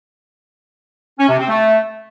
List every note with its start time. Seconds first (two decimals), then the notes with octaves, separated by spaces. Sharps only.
1.19 C#4
1.29 C3
1.38 C4
1.48 A3